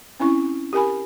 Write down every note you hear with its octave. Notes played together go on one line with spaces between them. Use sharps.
C4 C#4 E4 C#6
G4 A#4 G#5 B5